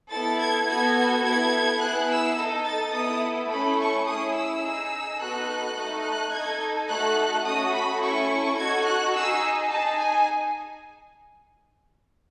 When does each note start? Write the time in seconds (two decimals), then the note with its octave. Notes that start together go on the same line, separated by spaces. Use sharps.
0.10 B3 E4 A4 A6
0.39 G#6
0.67 B3 F#4 A4 G#6
1.23 B3 E4 A4 G#6
1.79 B3 E4 G#4 F#6
2.09 E6
2.36 D#4 A4
2.65 A6
2.92 B3 E4 A4 D#6
3.49 A3 C#4 E4 A4 B5
3.77 C#6
4.05 C#4 E4 G#4 D#6
4.34 E6
4.62 D#4 G#4
5.18 B3 D#4 F#4 A4 F#6
5.75 A3 D#4 A4
6.02 F#6
6.31 D#4 A4 G#6
6.87 A3 D#4 F#4 A4 F#6
7.44 A3 C#4 F#4 D#6
7.72 B5
8.01 C#4 E4 A4 C#6
8.57 D#4 F#4 A4 G#6
8.85 F#6
9.14 D#4 G#4 E6
9.70 D#4 G#4 A5
9.97 G#5